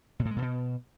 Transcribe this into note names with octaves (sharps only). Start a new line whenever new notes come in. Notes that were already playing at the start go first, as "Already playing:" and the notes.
B2
A2
G#3
A#2
B2